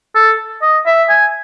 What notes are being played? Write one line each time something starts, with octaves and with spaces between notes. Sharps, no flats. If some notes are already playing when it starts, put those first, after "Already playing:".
A4
D#5
E5
G#5